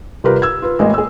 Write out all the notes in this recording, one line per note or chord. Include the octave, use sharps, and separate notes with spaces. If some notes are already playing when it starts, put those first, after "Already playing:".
C3 G3 F4 G4 A#4 B4
E6 G#6
F4 B4
A1 G#3 A#3 D#5
G#4 E6